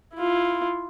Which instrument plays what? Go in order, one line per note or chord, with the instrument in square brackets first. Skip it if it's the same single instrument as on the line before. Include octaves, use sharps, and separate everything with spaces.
[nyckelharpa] E4 F4